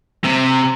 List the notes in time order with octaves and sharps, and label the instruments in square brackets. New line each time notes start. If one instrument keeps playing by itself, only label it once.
[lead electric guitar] C3